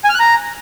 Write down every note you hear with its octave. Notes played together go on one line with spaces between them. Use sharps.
G#5
F6
F#6
A#5